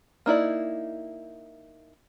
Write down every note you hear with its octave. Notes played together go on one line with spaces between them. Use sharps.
A#3 D#4 E4 D5